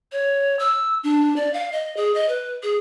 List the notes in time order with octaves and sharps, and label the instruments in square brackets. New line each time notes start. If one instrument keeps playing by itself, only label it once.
[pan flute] C#5
E6
D4
D5
F5
D#5
G#4
D#5
B4
G#4